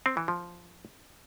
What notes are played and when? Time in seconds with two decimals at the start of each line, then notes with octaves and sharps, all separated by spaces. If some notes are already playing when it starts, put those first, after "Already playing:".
0.06 C4
0.17 E3
0.28 F3